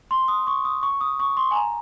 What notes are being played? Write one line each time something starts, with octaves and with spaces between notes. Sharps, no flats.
C6
D#6
C#6
D#6
C#6
D#6
C#6
C6
G#5
A#5